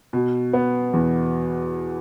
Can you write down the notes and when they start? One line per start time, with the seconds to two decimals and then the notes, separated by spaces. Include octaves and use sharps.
0.13 B2
0.53 B3
0.93 E2